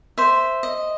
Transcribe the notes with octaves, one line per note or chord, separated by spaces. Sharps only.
C5 E5
D#5